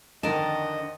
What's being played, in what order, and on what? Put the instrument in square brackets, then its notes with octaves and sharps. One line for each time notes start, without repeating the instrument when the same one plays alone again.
[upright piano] F2 D3 D#3 [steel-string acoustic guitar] D4 [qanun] A#4 A5 [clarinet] D#5